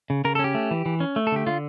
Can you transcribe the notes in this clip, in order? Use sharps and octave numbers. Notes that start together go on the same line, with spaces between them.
C#3
C#3 A#4
A4
C#4
G4
A3
E3
E3
C#4
A3
A4
D3 G4
D3 F4